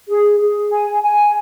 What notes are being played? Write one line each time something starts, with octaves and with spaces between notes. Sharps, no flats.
G#4
G#4
G#5
G#5